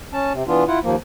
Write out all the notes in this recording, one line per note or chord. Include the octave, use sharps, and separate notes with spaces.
C#4 A5
C3
E3 B3 D4 F4
E4 F4 F#5
D#2 F3 A#3